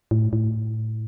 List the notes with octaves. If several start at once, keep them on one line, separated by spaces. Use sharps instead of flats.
A2
A2